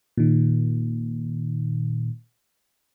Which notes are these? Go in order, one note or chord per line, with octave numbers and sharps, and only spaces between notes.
A#2 D#3